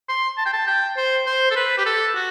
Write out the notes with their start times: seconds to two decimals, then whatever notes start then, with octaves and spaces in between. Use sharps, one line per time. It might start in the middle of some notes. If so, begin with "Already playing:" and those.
0.09 C6
0.38 A5
0.46 G5
0.53 A5
0.67 G5
0.97 C5
1.27 C5
1.51 A4
1.56 B4
1.78 G4
1.86 A4
2.15 F#4